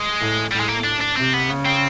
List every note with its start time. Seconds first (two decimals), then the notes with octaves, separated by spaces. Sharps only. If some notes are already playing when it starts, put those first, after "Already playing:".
Already playing: G#3
0.20 A2
0.52 A2 G3
0.60 G#3
0.68 A#3
0.84 D4
1.01 D4
1.16 C3 C4
1.33 B3
1.49 C#3
1.65 C4